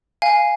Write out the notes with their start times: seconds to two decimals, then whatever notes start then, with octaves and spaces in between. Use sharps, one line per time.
0.22 F5 G#5